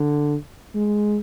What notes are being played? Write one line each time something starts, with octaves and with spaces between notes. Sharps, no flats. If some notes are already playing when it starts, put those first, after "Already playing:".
Already playing: D3
G#3